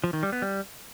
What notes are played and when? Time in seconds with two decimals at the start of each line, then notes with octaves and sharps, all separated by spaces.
0.04 F3
0.13 D#3
0.23 G3
0.32 B3
0.42 G3